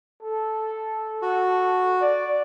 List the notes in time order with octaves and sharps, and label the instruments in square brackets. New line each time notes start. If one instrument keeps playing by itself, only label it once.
[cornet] A4
[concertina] F#4
[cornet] D5